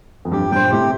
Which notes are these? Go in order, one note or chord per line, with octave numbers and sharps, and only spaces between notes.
F2
G2 G4
G2 A#2 C5 G5
A2 C3 G4